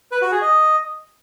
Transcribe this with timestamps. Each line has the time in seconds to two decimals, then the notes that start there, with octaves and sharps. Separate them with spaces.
0.12 B4
0.22 F#4
0.32 G#4
0.42 D#5